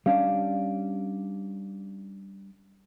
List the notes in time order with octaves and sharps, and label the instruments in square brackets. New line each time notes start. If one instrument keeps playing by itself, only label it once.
[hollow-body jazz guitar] G3 C#4 D4 [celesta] F5